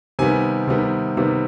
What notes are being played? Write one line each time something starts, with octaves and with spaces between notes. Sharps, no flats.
C3 D#3 G3 B3 G#5
C3 D#3 G3 B3
C3 D#3 G3 B3